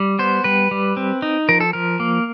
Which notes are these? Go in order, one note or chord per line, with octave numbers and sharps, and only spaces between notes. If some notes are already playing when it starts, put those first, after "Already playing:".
Already playing: G3
B3 C5
G3 B4
G3
C4
D#4
F3 A#4
A4
F3 A#4
A#3